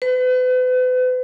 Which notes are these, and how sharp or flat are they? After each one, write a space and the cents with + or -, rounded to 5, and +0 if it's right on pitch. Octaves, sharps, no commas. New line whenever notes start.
B4 +40